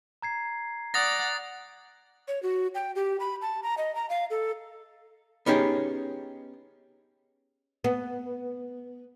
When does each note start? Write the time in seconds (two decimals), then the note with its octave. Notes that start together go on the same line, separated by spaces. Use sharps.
0.22 A#5 G#6 C7
0.94 D5 F#5 D#6 A6 A#6
2.28 C#5
2.43 F#4
2.75 G5
2.96 G4
3.20 B5
3.42 A5
3.63 A#5
3.78 D#5
3.95 A#5
4.10 F5
4.30 A4
5.46 B3 C#4 D#4 G4 G#4
7.84 B3